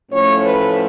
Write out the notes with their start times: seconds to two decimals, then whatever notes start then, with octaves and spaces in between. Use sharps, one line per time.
0.11 A2 F3 A3 C#4 C#5
0.46 B4